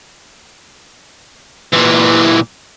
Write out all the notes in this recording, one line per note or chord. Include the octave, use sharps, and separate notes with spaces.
A#2 E3